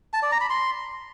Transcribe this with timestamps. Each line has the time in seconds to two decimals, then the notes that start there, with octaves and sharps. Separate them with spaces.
0.13 A5
0.22 D5
0.32 A#5
0.41 B5
0.50 C6